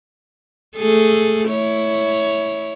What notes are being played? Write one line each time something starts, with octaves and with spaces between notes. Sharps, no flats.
A3 G#4 A4
E4 C#5